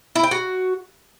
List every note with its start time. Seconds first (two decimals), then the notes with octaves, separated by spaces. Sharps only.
0.16 E4
0.23 G5
0.31 F#4